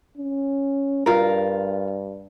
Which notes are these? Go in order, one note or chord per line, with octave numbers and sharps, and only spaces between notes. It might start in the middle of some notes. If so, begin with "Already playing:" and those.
C#4
G2 F4 A#4